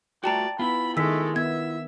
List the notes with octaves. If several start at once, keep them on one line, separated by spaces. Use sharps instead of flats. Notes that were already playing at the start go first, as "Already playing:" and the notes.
A3 F4 F#4 D5 G5 A5 A#5
B3 E4 F4 B5
D#3 G#3 A3 E6 B6
B3 E5 G#6